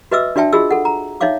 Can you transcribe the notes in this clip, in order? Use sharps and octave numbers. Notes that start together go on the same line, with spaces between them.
F#4 B4 D#5 E5 D6 E6
D4 F#4 D5 E5 G5 A5
F4 F#4 G#4 D#5 E6
A4 F#5
A#5
D#4 C#5 E5 F5 D6